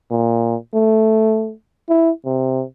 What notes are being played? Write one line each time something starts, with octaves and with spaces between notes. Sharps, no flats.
A#2
A3
E4
C3